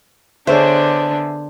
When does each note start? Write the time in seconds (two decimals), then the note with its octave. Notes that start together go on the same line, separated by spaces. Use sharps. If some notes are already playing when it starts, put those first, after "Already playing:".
0.47 D3 B3 D4 G#4 C5 C#5 E5